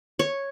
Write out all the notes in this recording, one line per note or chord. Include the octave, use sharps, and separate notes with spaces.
C#5